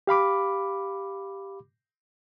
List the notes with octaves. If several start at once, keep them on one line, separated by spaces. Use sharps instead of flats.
G4 F5 B5 D6